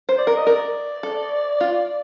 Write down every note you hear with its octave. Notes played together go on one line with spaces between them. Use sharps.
C5
D5
A#4
D#5
A#4 D5
A4
F4